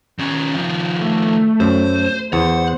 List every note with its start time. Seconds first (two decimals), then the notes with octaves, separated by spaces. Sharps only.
0.19 D#3 C#4
0.54 D#3 F3
0.99 A3
1.60 F#2 C5
2.33 E2 C5 F#5